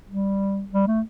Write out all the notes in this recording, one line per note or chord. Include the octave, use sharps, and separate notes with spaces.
G3
G3
A3